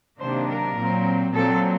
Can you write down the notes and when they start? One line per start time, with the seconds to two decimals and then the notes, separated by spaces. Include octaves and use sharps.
0.20 C3 D#3 F#3 A#3 D4 C5
0.48 A#4
0.76 A#2 F#3 C4
1.33 A#2 F#3 C4 A4